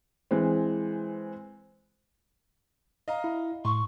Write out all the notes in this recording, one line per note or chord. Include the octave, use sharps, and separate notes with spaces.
E3 G#3 C4
D#5 F5 A#5
E4
A2 C6 C#6